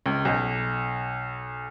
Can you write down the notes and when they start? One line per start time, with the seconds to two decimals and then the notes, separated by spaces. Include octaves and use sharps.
0.06 C#2
0.25 B1